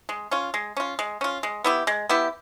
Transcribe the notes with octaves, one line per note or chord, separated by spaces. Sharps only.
G#3
C#4 F4
G#3
C#4 F4
G#3
C#4 F4
G#3
B3 E4 G4
G#3
B3 E4 G4